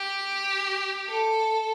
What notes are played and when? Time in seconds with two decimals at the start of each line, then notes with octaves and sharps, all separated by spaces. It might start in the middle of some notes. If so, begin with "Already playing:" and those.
Already playing: G4
1.08 A4